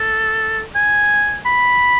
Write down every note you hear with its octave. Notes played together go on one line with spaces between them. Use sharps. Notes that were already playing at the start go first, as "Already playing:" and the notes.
Already playing: A4
G#5
B5